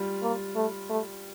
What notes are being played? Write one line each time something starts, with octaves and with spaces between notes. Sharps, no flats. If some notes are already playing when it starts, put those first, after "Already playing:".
Already playing: G3 F4
A#3
A3
A3